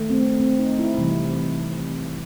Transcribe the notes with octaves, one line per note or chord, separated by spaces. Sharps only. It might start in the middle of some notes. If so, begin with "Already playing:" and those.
Already playing: D#3 A3
C4
C4
D#4
E4
C3 E3 G3